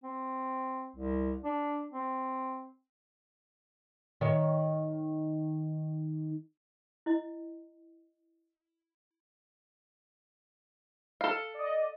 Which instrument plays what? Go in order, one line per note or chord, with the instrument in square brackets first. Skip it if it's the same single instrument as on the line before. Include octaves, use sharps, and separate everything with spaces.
[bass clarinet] C4
C2
D4
C4
[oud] D#3 C#5
[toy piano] E4 D#5
[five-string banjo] A4 F5
[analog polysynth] D5 D#5